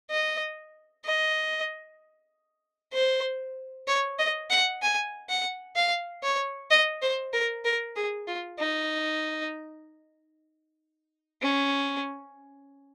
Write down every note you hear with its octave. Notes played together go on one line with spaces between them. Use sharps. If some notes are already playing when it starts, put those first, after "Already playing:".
D#5
D#5
C5
C#5
D#5
F#5
G#5
F#5
F5
C#5
D#5
C5
A#4
A#4
G#4
F4
D#4
C#4